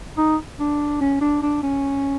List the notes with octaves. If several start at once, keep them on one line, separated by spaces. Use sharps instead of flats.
D#4
D4
C#4
D4
D4
C#4